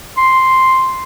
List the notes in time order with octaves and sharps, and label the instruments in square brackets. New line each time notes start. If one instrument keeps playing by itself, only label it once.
[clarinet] C6